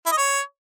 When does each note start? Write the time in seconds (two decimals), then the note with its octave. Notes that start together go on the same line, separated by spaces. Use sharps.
0.06 E4
0.12 D#5
0.17 C#5